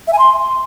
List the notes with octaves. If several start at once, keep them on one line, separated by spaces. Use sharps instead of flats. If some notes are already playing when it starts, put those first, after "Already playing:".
E5
G#5
C6